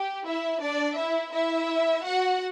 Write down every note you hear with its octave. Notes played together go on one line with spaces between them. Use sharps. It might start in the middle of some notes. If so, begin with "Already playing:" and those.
Already playing: G4
E4 E5
D4 D5
E4 E5
E4 E5
F#4 F#5